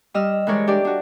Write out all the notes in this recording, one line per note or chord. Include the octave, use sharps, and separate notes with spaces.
G3 D#5 E6 F6
E3 G#3 A#4 C#5 D5
D4 G4 A4 D5
D4 F#4